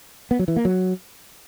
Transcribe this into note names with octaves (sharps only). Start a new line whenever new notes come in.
B3
F#3
E3
A#3
F#3